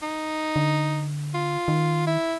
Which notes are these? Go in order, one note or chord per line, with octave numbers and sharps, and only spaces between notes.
D#4
D3
F4
D#3
E4